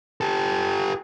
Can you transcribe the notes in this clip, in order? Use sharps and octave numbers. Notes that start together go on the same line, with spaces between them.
G4 A4